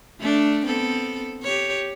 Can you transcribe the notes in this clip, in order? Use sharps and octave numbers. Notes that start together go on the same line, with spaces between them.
A3 D4
B3 C4 A4
G4 C#5